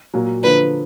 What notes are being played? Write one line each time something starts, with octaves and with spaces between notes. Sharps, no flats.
A#2 F#3 A#3
D3 F3 A#3 D4 B4